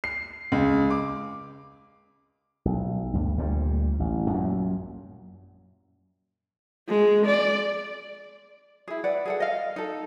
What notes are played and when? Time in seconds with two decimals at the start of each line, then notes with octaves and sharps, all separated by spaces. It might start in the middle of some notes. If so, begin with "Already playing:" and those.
0.04 C7
0.52 C#2
0.90 D6
2.65 B1
3.13 D2 G2
3.38 D2 A#2 F3 G3
4.00 A1
4.30 F#2 A#2
6.89 G#3
7.27 D5
8.88 E4 G#4
9.04 B4 D5 F#5
9.25 G#4 A4 F#5
9.40 D#5 F5
9.76 D#4 A4